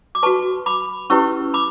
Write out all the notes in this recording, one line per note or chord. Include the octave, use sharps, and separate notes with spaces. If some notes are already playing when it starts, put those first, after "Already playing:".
D6
F#4 B4 A5 C#6
B5 D6
C#4 E4 G4 B4 C#6 E6
B5 D6